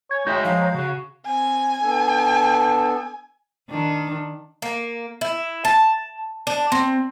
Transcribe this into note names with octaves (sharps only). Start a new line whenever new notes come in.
C#5 G#5
G#3 D#4 F#4 C#5 E5 G5 A#5
F3 F5
C#3 F#4 G#4
C4 G#5
B3 D4 A4
D#3 D4
A#3
E4
A5
D4
C4